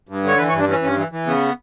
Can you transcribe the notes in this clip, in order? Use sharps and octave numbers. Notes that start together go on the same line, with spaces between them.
G2
D3 C#5
E3 B4
C#5
G2
D4
E3 C#4
G2 C#4
E3
E3
C#3 B3